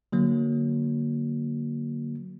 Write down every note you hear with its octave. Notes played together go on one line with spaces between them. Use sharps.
D3 F#3 A#3